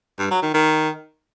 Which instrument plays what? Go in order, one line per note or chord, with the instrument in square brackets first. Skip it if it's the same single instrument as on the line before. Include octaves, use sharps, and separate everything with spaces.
[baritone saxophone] G2
F#3
D#3
D#3